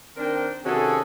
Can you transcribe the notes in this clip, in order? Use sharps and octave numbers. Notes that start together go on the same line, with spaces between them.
D#3 C4 D4 A#4 C5 G5
C3 D#3 C#4 F#4 G#4 A4